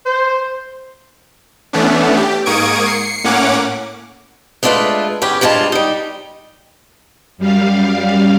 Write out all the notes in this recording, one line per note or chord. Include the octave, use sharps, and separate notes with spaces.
C5
E3 A3 B3 C#4 D4
G4
G#2 A#3 C#6 D#6 G#6 D7
C7 C#7
A2 A#3 C#4 C#5 F#5 D6
G#3 A3 D4 F4 A4 B4
E2 C#4 G4 B4
G2 G3 G#3 F4 A5
G3 D#4
F#2 G3 F5